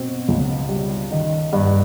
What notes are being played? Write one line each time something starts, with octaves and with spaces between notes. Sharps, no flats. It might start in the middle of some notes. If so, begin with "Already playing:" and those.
Already playing: B2 C4
C#2
G3
D#3
G2